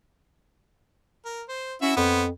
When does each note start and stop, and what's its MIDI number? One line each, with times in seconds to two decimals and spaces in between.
1.25 1.42 70
1.48 1.75 72
1.82 1.93 61
1.82 1.94 64
1.82 1.94 66
1.82 1.94 76
1.97 2.30 41
1.97 2.24 59
1.97 2.24 72